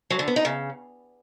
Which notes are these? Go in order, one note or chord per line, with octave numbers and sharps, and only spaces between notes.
F#3
D3
B3
D#4
C#3